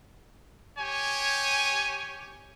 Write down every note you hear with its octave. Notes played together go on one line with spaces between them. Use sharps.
G4 C#5 G#5